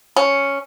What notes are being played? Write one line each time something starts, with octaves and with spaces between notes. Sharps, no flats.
C#4